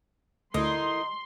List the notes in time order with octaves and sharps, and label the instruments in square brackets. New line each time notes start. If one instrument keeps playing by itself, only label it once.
[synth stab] D2 [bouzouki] D#4 [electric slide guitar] E4 A4 A#4 [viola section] C6